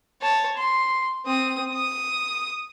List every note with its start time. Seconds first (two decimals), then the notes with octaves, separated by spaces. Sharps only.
0.22 C#5 A5
0.57 C6
1.26 C4 D#6
1.73 D#6